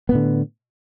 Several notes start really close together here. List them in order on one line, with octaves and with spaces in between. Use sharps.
B3 A2 D3